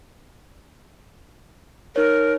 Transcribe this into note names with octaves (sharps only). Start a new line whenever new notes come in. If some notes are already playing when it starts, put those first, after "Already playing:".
D#4 A#4 C#5